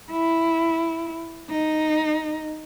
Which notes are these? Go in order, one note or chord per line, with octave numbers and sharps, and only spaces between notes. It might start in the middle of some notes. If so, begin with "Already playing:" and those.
E4
D#4